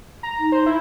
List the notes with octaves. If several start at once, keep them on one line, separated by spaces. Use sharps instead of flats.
A#5
D#4
C5
E4